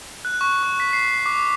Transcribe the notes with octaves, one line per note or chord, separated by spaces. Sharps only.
F#6
C#6
C#6
B6
C7
D6